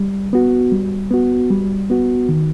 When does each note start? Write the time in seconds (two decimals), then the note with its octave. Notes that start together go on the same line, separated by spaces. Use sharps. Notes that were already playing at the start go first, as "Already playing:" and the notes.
Already playing: G3
0.33 B3 F#4
0.72 G3
1.11 B3 F#4
1.50 G3
1.90 B3 F#4
2.29 D#3